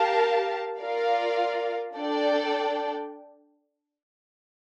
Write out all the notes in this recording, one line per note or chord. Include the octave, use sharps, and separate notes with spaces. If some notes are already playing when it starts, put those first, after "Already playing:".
Already playing: G4 A#4 F5 A5
F4 A#4 D5 F5
D4 A4 D5 G5